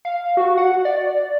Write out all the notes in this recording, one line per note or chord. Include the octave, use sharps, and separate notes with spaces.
F5
F#4
F#5
D5